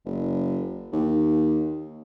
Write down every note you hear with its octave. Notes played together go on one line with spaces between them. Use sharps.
F#1
D#2